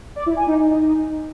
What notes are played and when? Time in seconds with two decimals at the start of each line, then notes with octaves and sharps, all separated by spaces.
0.16 D5
0.26 E4
0.37 G#5
0.47 D#4
0.57 D#4